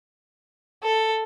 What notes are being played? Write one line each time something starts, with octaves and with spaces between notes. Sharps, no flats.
A4